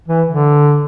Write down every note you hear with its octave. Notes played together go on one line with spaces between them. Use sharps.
E3
D3